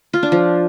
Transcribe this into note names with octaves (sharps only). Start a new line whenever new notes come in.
F4
D4
F3